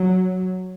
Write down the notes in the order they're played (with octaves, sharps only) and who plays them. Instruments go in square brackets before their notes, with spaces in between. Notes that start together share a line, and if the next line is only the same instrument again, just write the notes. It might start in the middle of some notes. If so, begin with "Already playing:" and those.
Already playing: [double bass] F#3